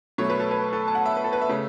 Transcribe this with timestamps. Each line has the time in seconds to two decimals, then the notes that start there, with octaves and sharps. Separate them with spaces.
0.18 B2 F#3 A3 C#5
0.30 B4
0.40 A4
0.51 B4
0.73 A4
0.88 A5
0.95 F#5
1.06 E5
1.17 B4
1.24 A4
1.33 B4
1.41 E5
1.49 C#3 A3